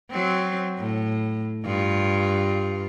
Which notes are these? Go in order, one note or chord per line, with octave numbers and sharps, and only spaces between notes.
F#3 C4
A2
G2 F4